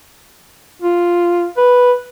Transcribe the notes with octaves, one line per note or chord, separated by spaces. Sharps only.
F4
B4